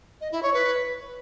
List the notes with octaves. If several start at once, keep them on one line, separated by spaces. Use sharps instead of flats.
D#5
E4
C#5
B4